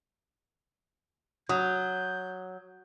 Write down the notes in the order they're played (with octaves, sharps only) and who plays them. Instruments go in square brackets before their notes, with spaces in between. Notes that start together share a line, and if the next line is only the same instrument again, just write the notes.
[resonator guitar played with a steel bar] F#3 [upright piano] D#6 [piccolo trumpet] G6